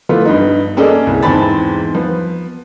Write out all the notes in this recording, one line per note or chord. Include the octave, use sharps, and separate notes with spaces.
E3 F3 A3 B3 F4
G2 B3 D#4
A#3 C#4 G#4 A4 D5 D#5
C2
E2 G#2 C4 A5 B5 A6
F3 B3